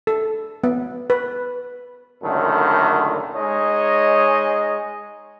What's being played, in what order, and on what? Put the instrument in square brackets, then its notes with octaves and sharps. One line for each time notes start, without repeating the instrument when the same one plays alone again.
[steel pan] A4
B3
B4
[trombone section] C#2 F#2 A#2 D3 D#3 A3
[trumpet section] G#3 D#4 C#5 D#5